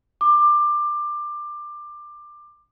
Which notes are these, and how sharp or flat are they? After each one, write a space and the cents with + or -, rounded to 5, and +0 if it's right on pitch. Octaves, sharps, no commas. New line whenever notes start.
D6 +20